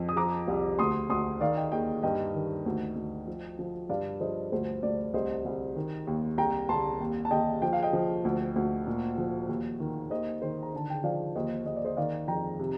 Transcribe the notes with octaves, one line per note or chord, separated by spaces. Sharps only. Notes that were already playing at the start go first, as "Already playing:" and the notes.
Already playing: F2
D#6
F3 A#5 D6
C2
D2 C6 D#6
D2 C6 D#6
D#3 D5 F5
D#5 G5
D#2 D#5 G5
G2 D#5 G5
D#3
D2
D2
F3
F3
G2 D5 F5
F3 C5 D#5
D2 C5
D2 D5
C2 C5 D#5
C2
D#3
D#2
C2 G5 A#5
C2 A5 C6
D#2
A5
D#2 D#5 G5
F3 G5
F5
D#5 G5
F3
D2
D2
A#2
F3
D#2
D#3
D#2 C5 D#5
D#3 C5
A#5
D3 A5
G5
F3 D5 F5
D#2 C5 D#5
D#2 D#5
D5
C5 D#5
D#3 D5 F5
F2 G5 A#5
C3